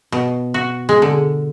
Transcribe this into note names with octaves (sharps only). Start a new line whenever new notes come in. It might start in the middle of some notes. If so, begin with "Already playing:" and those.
B2
F#4
G#3
D3